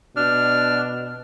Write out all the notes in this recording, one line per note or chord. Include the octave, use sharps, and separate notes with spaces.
B2 D4 F6